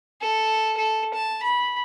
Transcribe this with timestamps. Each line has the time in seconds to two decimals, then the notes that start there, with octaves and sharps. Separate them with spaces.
0.21 A4
0.77 A4
1.14 A5
1.43 B5